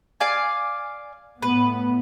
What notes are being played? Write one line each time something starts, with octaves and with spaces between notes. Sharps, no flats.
D5 F5 G#5
A2 B3 B4